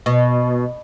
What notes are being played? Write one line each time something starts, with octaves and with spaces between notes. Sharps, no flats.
B2